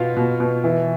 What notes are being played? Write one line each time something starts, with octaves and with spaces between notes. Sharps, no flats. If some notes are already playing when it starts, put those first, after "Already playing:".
Already playing: B2 B3 F4
B2
B2
E3